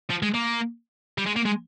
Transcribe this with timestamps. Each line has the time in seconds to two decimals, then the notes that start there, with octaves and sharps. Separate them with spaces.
0.10 F3
0.23 G#3
0.34 A#3
1.18 G3
1.26 G#3
1.36 A#3
1.45 G#3